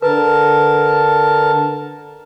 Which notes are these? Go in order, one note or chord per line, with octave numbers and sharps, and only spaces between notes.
D3 A#4 B4 A5